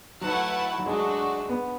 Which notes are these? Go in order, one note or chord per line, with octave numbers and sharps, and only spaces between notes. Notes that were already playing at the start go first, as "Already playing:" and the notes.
F#3 A3 E4 B4 F#5 A5
F#3
G#3 A3 D4 F#4
B3